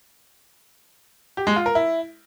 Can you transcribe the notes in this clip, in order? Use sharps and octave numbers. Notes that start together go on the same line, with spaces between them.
G4
G#3
F4
A#4
E4